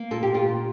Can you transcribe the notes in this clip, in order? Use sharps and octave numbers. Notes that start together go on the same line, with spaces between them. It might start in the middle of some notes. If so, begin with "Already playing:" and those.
Already playing: A#3
A#2 A4
G4
A#2 F4